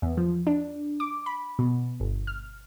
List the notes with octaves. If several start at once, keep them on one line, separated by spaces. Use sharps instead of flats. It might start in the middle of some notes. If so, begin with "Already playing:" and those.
E2
F3
D4
D6
B5
B2
G1
F6